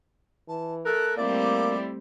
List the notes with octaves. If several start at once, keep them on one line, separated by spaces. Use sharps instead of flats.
E3 A5
A3 A4 A#4 F#6
G3 A3 A#3 C4 E4 D5 D6